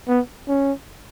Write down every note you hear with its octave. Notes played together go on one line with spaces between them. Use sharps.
B3
C#4